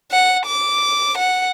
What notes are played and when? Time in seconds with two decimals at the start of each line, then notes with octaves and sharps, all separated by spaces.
0.11 F#5
0.46 D6
1.18 F#5